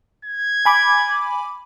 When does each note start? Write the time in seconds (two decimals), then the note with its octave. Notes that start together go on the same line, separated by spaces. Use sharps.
0.25 G#6
0.65 G#5 B5 D6